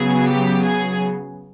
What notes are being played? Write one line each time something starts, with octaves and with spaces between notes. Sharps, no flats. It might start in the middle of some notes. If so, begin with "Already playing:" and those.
Already playing: C#3 F#3 B3 G#4
G4
G#4